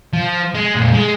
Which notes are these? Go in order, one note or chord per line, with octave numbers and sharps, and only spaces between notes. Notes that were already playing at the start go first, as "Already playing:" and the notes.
F3
G#3
F2 A#2
G#3